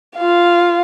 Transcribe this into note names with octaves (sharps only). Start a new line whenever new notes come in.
F4 F5